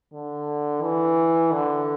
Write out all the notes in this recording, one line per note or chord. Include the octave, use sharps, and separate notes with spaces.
D3
E3
D3